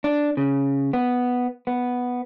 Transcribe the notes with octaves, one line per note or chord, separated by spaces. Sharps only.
D4
C#3
B3
B3